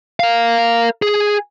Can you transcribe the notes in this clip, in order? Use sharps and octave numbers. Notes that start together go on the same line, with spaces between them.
A#4 F5
G#4